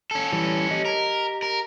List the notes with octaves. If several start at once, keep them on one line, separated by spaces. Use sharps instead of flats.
C#4 A4
E3 G3
G4 D#5
A#4
A#4